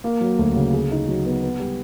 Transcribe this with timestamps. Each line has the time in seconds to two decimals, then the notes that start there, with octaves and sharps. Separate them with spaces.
0.04 A#3
0.21 F#3
0.39 D2
0.55 C#3
0.74 G#4
0.91 D#4
1.08 F#3
1.26 B3
1.43 B3
1.60 G3